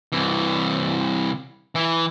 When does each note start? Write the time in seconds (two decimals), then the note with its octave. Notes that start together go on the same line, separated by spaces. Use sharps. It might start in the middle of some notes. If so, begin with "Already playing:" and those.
0.12 C2 E3
1.75 E3